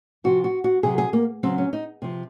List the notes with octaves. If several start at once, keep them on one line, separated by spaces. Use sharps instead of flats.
C3 F3 F#4
F#4
F#4
C3 F#3 G#4
G#4
A#3
C#3 F#3 C4
C#4
D#4
C3 F3